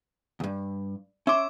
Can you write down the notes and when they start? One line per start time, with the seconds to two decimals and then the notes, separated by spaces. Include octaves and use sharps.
0.40 D2 G2
1.27 C#4 E5 C6 D6